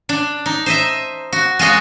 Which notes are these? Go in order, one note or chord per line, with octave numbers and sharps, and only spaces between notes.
D4
D#4
C5 D#5 E5
F#4
G#3 F4 F#4 D#5